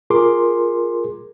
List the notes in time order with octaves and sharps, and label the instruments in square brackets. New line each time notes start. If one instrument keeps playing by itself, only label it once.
[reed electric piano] F4 G#4 A#4 C6 D6